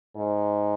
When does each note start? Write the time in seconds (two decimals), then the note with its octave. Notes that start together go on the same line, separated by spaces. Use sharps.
0.17 G#2